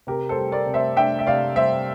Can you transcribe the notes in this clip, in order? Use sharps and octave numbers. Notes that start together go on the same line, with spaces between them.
C3 G4 A#4
A4 C5
G3
A#4 D5
C3
C5 E5
D4 E5 G5
E5
C3 D5 F5
G3 C5 E5